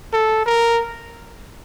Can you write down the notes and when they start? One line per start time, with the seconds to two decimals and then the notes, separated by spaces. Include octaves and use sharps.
0.14 A4
0.46 A#4